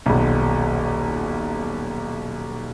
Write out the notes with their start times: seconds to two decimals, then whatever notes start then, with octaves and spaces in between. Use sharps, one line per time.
0.06 D#1 B1